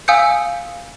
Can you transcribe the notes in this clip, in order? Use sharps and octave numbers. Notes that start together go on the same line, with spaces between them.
F5 G#5 D#6 E6 G6 C#7